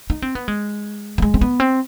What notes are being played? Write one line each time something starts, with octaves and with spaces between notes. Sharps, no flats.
D#4
C4
B3
G#3
G3
G#3
C4
B3
C4